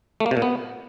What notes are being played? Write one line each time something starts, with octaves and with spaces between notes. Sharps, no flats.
A3
A#3
C3
A#2
B3